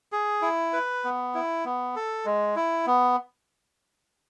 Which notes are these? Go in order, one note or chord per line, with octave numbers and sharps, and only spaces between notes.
G#4
E4
B4
B3
E4
B3
A4
G#3
E4
B3